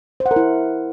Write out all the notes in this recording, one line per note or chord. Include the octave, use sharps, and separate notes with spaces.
C5
F#5
A#4
E4